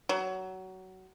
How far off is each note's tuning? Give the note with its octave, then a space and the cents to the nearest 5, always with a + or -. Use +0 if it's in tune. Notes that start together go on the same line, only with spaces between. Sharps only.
F#3 +20